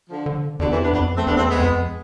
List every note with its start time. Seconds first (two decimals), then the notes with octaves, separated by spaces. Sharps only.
0.10 D3 F3
0.26 D3
0.59 E2 B2 D3
0.71 C3 E3
0.82 B3 D4
0.92 F2 B3 D4
1.15 A3 C4
1.26 E2 B3 D4
1.37 A3 C4
1.48 G#3 B3
1.60 F2